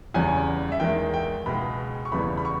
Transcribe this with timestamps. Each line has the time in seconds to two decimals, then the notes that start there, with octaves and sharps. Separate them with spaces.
0.14 E2 C#3 G3 C#4 G#5
0.72 E5
0.80 E2 D#3 G#3 G5
1.14 G5
1.46 C#2 B2 G#3 B5
2.05 C#6
2.12 E2 C#3 E3 G3 B3 B5
2.37 B5
2.45 C#6